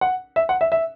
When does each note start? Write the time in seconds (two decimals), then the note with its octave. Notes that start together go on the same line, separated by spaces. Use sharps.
0.01 F#5
0.36 E5
0.49 F#5
0.61 E5
0.72 E5